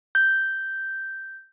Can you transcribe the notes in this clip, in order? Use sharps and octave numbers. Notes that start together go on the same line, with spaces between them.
G6